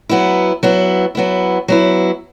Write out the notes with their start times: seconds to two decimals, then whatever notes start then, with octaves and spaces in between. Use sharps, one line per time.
0.09 F#3 B3 E4
0.63 F#3 B3 E4
1.15 F#3 B3 E4
1.68 F#3 B3 E4